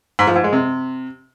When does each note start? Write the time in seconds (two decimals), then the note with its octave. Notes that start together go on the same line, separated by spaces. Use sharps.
0.19 G#2
0.27 F3
0.36 G#2
0.44 G#3
0.53 C3